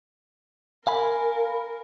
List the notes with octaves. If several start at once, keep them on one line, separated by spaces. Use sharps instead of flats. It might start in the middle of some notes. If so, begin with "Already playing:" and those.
A#4 F5 G#5 B5